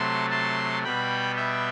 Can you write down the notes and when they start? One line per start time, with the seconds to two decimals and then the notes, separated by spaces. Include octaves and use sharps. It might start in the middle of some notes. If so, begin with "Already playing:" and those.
Already playing: C3 F#3 A3 A5 C6
0.31 A5 C6
0.84 B2 G3 B3 G5 B5
1.36 E5 G5